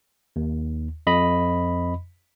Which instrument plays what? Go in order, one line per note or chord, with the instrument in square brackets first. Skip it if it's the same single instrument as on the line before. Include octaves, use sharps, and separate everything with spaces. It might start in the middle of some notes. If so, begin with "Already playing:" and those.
[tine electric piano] D#2
F2 D#5 B5